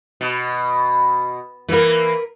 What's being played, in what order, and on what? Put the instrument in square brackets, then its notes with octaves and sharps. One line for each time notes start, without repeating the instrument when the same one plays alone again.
[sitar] B2
[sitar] E3 A#3 [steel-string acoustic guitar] A#4 B4